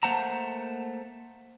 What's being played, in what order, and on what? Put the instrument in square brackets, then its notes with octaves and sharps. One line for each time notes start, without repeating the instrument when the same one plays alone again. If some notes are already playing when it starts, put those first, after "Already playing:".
[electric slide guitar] A3 A#3 C5 F#5 A5 A#5